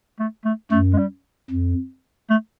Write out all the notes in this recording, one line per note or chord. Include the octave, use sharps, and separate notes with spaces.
A3
A3
F#2 A3
G#3
G3
F2
A3